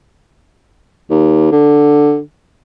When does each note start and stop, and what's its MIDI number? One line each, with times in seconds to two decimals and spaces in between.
1.10 1.48 39
1.51 2.19 50